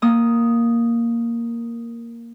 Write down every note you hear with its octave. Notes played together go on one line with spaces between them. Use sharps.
A#3 D#6